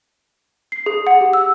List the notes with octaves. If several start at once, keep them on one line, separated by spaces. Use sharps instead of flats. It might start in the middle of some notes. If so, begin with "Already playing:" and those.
C7
G#4
F#5
G4
E6